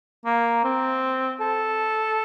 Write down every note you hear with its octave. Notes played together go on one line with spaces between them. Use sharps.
A#3
C4
A4